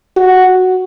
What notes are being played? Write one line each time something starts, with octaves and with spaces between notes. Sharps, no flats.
F#4